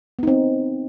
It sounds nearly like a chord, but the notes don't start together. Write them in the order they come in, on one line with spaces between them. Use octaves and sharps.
B3 D#4 C4